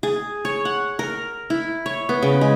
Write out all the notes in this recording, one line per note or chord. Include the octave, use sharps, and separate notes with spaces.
G#4
C#5
F#5
A#4
E4
C#5
B3
C#3
G#3